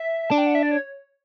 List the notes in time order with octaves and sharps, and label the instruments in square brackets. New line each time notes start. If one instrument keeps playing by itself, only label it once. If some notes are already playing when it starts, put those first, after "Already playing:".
Already playing: [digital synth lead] E5
[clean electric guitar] D4 [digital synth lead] A5
[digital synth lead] G5
F#5
E5
D5
C#5